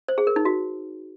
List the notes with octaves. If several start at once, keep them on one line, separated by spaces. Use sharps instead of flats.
C5
G#4
A#4
D#4
F#4